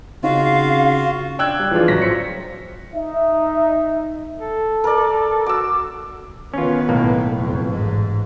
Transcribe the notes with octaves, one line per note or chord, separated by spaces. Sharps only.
C#3 C4 C#4 D#4 F4 F#4 F5
D4 G5 E6 F#6 G#6
G3
E3 F3 G#3 D4 F4
A1 F#3 A#6 B6
F4 C5 C#7
D#4 E5
A4
A#4 D5
F#4 D6 E6
D#3 B3 C#4 F4
B1 A2 A#3
F#1 F2
A1 G#2